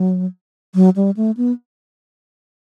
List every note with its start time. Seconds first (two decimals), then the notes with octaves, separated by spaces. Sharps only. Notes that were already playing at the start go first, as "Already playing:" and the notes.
Already playing: F#3
0.75 F#3
0.96 G3
1.17 A3
1.37 B3